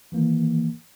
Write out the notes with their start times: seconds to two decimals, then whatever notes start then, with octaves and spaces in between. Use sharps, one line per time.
0.12 D#3 E3 A#3